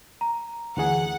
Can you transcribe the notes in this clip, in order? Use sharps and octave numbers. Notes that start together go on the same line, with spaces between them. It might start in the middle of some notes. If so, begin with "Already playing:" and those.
A#5
D2 E3 G#4 F#5